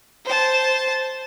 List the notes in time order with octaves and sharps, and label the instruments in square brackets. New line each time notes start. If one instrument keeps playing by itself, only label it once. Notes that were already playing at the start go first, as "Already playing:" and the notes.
[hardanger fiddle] C5 A5